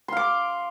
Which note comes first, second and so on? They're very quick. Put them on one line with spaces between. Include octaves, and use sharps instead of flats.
C6 F5 D6